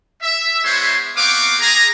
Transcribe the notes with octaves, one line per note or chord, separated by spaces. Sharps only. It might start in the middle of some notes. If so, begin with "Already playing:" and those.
E5
G#3 B3 E4 C5 C#5 C6
B3 C4 F5 C#6 D6
G#4 A#5